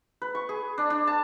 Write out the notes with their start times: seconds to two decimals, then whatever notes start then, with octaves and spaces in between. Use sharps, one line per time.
0.22 B4
0.35 C#6
0.49 G#4
0.78 D4
0.90 D4
1.07 A5